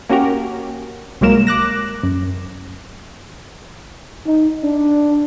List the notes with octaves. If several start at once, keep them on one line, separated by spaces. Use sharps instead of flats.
A#3 C#4 F#4 G4 A#4
C2 F#3 G#3 A#3 A#4 E7
D6 F#6 A#6
F#2
D#4
D4